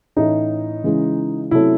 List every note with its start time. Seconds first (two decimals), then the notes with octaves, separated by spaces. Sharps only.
0.16 A2 E3 A3 C#4 D#4
0.84 C#3 E3 G#3
1.51 C3 F#3 A3 C#4 E4